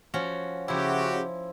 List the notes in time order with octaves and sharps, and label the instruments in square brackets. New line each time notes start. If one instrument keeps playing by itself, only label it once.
[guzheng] F3 C#4 F#4
[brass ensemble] C#3 F#4 G4 [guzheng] F3 E4